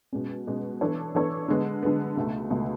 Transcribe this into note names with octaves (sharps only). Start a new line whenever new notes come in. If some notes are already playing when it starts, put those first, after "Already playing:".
B2 G#3 C#4
B2 G#3 C#4
E3 B3 D4 A4 C#5
E3 B3 D4 A4 C#5
D3 G#3 B3
D3 G#3 B3
C#2 B2 A3
C#2 B2 A3